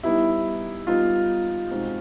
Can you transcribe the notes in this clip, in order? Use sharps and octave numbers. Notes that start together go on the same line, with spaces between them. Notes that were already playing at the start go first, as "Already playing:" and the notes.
G3 B3 D#4 E4 G4
G3 B3 D#4 F4 G4
B2 G#3 C4 D#4 F#4